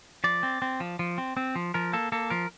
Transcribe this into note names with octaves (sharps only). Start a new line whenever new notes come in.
F3 D5
C4
C4
F3
F3
C4
C4
F3
F3 A#4
A#3 A4
A#3 A4
F3 A#4